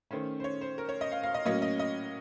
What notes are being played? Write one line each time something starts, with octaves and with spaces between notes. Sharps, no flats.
D#3 A3 C#4 C5
C5
C#5
C5
A#4
C#5
D#5
F5
F5
D#5
A2 F#3 A#3 C#4 D#5
D#5
D#5